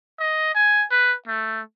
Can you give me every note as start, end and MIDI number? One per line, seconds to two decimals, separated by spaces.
0.20 0.52 75
0.55 0.85 80
0.91 1.15 71
1.27 1.61 57